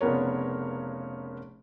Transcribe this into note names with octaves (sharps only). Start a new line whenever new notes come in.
F1 C#3 B3 A#4 C#5